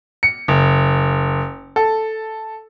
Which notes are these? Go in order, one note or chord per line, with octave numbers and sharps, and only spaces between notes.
C#7
F#1
A4